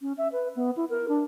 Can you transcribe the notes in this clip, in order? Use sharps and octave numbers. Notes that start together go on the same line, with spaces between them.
C#4
E5
B4
B3
E4
A#4
D4